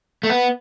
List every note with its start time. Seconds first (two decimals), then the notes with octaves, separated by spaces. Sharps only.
0.23 A3
0.30 B3